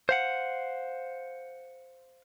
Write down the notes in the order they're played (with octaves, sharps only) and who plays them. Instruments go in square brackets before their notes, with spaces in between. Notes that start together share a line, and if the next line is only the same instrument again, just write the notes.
[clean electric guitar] C5 F5 F#5